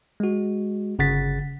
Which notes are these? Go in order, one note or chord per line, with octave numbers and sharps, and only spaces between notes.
G#3 F#4
G1 C#3 F#5 A6 B6